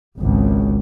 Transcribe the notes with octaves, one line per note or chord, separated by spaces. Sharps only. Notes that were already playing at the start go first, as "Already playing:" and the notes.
G#1 C#2